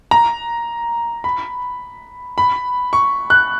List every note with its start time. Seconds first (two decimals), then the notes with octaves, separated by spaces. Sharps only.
0.11 A#5
1.24 B5
2.38 B5
2.93 C#6
3.30 F#6